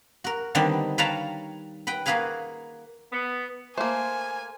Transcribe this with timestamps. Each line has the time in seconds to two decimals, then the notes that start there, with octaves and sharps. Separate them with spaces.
0.24 F#4 A#4
0.55 D3 D#3 G3 B3 C4 D#4
0.98 B4 C#5 F5 G5 A5 A#5
1.87 B4 F#5 G5
2.06 A#3 F#4 G#4 B4 F5 G#5
3.12 B3
3.78 A3 A#3 C5 G#5